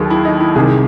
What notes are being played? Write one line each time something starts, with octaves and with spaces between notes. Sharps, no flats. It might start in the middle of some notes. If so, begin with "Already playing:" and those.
Already playing: D#2 D#3 F#3 G#4 A4
E4
D#4
E4
C2 C3 D#3 G#4